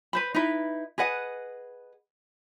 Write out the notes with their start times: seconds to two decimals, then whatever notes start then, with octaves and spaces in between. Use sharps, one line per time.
0.13 B4 C5 B5
0.34 D#4 E4 B4
0.98 G#4 B4 D#5 F#5